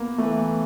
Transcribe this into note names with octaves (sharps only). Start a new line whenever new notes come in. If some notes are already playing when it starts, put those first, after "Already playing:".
Already playing: A#3 B3
E3 A3